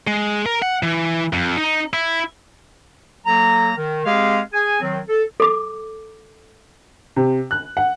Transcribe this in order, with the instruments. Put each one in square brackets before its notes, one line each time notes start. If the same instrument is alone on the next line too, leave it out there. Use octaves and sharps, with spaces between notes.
[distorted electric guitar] G#3
A#4
F#5
E3
F2
D#4
E4
[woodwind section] F#3 A#3 A4 A#5
D#3
G#3 C4 G4 G#4 F5
G#4 G#5
D#3 F#3 C4
A4
[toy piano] A4 D6
[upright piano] C3
F#6
F#5